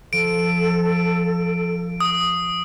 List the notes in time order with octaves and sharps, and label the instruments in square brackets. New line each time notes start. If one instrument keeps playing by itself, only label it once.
[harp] F3 [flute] A4 [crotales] D7
[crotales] D#6